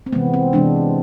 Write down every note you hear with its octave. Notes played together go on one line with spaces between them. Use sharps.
C4
C3 E3 G#3 B3
C4
C3 E3 G#3 B3 D4